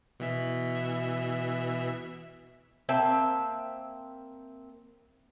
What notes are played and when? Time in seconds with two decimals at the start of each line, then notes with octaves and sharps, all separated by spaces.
0.20 B2 E3 E5
2.89 A#3 C4 E5 A5